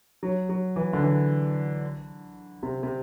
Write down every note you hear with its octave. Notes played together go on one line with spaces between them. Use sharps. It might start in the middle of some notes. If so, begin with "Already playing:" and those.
F#3
F#3
E3
D3
E3
C3
C3